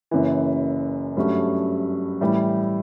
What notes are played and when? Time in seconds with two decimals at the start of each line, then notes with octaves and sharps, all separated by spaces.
0.11 F#1 F#2 E3
1.17 G2 F#3 A3 C#4
2.21 A2 E3 G3